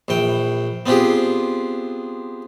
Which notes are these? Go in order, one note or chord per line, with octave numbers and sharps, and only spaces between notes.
A#1 E3 G5
B3 C4 D4 F4 G4 G#4